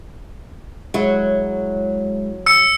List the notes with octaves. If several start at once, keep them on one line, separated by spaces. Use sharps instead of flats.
F#3 G#3 E4
E6 C#7